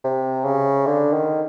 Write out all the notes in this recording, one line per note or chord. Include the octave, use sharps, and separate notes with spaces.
C3
C#3
D3
D#3